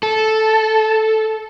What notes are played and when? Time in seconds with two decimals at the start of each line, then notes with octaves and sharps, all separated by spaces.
0.03 A4